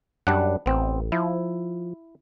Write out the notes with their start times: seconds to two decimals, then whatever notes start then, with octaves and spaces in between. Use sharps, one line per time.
0.27 F#2 G3 D4 F#5
0.66 A1 B3 C4
1.12 F3 E4